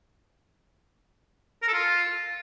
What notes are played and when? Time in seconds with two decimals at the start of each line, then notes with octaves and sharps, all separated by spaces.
1.62 A#4
1.68 A4
1.73 F4